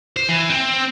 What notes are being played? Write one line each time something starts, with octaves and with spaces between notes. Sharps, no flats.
C5
E3
C4